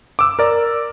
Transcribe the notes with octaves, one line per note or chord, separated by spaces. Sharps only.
D6 E6
A#4 D5